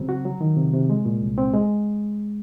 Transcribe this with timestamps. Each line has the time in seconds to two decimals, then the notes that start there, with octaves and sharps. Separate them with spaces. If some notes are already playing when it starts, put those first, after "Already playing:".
Already playing: C#3 F#3 C4
0.09 F#4
0.25 F#3
0.41 D#3
0.57 C3
0.73 C3
0.90 G#3
1.05 A#2
1.22 C2
1.38 C4
1.54 G#3